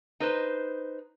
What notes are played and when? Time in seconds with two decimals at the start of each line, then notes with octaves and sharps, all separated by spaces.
0.20 D#4 B4 C5